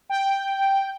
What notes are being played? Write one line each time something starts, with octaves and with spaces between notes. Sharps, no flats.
G5